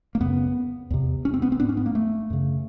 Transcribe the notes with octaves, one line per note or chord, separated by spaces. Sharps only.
A#3
F#2 C#3 B3
E2 C3
C#4
C4
B3
C4
G#2 D4
C#4
B3
A#3
A3
F#2 C#3